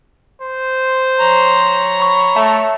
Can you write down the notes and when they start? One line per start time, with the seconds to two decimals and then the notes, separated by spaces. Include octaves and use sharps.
0.41 C5
1.19 C#5 A#5
2.00 B5 C#6
2.36 A3 E5 A5